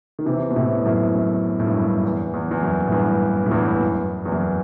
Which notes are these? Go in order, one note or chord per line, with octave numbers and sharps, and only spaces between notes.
D#3
C3 E3
B2
A2 C3
F#2 A2
F#2
A2
G2
F#2
E2
E2
E2
F#2
A2
E2 G2
A2
E2 G2
F#2
E2
F#2